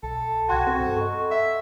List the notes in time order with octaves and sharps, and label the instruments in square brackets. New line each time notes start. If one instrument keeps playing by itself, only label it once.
[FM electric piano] B1 [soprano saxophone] A4
[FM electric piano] C2 G5 [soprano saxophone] F#4 [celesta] C6 F#6 G#6
[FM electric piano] C4 A4 G5
G2
[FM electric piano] A4 [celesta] D#5 B5 C#6
[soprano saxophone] E5